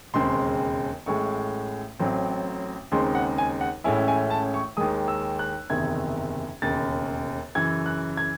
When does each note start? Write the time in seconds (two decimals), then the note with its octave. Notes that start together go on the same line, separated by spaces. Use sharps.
0.14 E1 D#2 C#3 G#3 C4 C6
1.06 A1 A2 G#3 C#6
1.99 A1 A2 F#3 C4
2.92 D#2 C#3 G#3 C4 D#4 C6
3.15 F#5
3.38 G#5
3.61 F#5
3.84 A1 A2 G#3 C#4 E4 G#5
4.08 G#5
4.30 A5
4.54 C#6
4.77 D#2 D#3 G#3 D#6
5.08 E6
5.39 F#6
5.70 F#1 E2 C3 D#3 G#6
6.62 E1 D#2 C#3 A6
7.55 F#2 C#3 E3 G#6
7.86 F#6
8.17 G#6